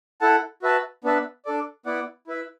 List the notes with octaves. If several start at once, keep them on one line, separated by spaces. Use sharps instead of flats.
E4 A4 F#5 A5
F#4 B4 E5 A5
B3 D4 B4 E5 A5
D4 A4 D5
B3 E4 D5 F#5
E4 B4 E5